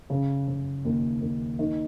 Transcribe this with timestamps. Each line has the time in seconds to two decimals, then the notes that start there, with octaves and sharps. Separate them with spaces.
0.10 C#3
0.47 C#3
0.85 D#2
1.21 D#2
1.59 D#3